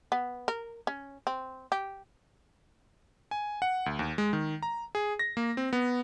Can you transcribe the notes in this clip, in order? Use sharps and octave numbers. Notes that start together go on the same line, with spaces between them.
B3
A#4
C#4
C4
G4
G#5
F#5
D2
D#2
G#3
D#3
A#5
G#4
A#6
A#3
C4
B3